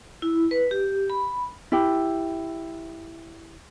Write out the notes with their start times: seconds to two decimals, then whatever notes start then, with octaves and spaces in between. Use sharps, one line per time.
0.22 E4
0.51 B4
0.71 G4
1.10 B5
1.72 E4 G4